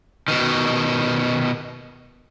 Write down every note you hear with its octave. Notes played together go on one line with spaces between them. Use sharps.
B2 D#3